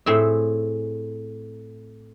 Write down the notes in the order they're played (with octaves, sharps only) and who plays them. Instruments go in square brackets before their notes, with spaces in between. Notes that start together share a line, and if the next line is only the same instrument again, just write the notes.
[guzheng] A2 C4 G#4 E5